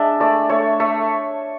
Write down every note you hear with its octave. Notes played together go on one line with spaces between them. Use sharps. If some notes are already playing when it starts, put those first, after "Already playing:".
Already playing: G#3 D4 E5
A3 D5
A3 C#5
A3